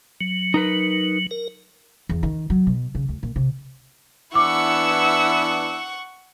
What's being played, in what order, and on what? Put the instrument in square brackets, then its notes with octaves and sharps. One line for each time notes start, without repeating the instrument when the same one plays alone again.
[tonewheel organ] F#3
[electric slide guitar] D#4 A#4 B4
[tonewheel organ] A#4
[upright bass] E2
D#3
F#3
B2
C#3
D2
A#2
C3
[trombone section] E3 B3 D4 [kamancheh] E4 E6 [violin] F#5 C#6 [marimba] D6